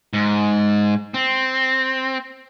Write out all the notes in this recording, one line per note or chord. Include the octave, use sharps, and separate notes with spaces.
G#2
C4